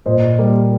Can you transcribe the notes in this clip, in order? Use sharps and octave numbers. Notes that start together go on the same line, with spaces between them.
A#2 C5 D#5
G3 A#3